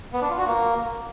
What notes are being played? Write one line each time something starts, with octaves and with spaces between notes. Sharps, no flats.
B3
D4
F4
F#4
A#3